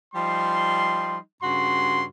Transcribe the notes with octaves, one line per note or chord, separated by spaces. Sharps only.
F3 G3 D#4 C6
G2 C#3 F#4 C6